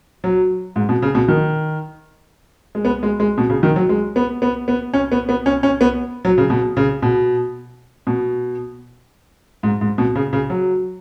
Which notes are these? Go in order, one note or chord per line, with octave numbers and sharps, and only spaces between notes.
F#3
G#2
B2
C#3
B2
D#3
G#3
B3
G#3
G#3
B2
C#3
D#3
F#3
G#3
B3
B3
B3
C#4
B3
B3
C#4
C#4
B3
F#3
C#3
B2
C#3
B2
B2
G#2
G#2
B2
C#3
C#3
F#3